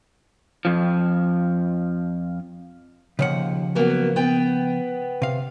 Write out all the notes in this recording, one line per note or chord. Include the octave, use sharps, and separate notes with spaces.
F2 F3
D#2 C#3 F3 F#5
F#3 A#3 B3
B3 G5
C3 F5